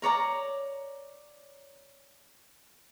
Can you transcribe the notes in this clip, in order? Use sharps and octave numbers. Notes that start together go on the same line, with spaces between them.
A#4 C#5 D5 A#5